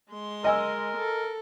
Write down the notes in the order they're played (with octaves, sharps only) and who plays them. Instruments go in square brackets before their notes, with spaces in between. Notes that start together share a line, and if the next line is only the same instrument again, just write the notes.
[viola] G#3 C6
[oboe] A#4 [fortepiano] D#5 G#5 E6
[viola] A4